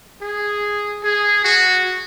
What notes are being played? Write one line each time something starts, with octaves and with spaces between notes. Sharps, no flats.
G#4
G#4
F#4